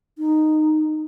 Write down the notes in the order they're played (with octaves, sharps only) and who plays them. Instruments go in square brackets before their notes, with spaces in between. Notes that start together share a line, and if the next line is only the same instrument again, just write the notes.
[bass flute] D#4